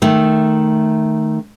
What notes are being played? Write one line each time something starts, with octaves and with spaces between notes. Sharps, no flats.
D#3 A3